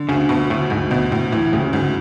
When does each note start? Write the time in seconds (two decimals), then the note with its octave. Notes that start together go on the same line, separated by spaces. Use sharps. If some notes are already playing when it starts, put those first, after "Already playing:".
Already playing: D3
0.09 D2 C#3
0.29 D2 B2
0.50 D2 A2
0.70 D2 G#2
0.91 D2 B2
1.11 D2 A2
1.32 A2 E3
1.53 A2 C#3
1.73 D2 G#2